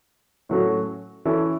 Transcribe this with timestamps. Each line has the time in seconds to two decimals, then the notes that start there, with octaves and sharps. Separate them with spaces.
0.49 A2 F#3 A3 C#4 F#4
1.25 E3 C#4 E4 A4